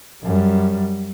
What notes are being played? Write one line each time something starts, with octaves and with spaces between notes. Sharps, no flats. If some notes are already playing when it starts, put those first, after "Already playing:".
F#2 G3